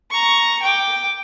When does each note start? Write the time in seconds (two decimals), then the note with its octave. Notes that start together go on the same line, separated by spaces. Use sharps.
0.11 A#5 C#6
0.62 G5 D6